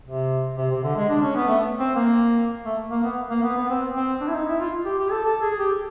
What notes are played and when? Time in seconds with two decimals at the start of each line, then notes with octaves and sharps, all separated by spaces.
0.05 C3
0.57 C3
0.70 C3
0.83 D3
0.96 G#3
1.09 D4
1.22 C#4
1.35 B3
1.48 A3
1.78 C4
1.95 A#3
2.65 A3
2.91 A#3
3.04 B3
3.30 A#3
3.43 B3
3.56 B3
3.68 C4
3.95 C4
4.20 D4
4.28 E4
4.34 D#4
4.47 E4
4.60 F4
4.85 G4
4.99 G4
5.11 A4
5.25 A4
5.42 G#4
5.59 G4